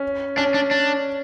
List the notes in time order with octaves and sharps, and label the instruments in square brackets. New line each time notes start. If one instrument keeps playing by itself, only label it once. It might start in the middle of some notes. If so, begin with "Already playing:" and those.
Already playing: [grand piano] C#4
[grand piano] C#4 [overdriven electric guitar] D4
[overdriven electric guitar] D4
D4